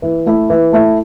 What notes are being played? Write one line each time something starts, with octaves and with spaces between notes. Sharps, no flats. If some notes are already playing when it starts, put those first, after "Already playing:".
E3
A3 E4
E3
A3 E4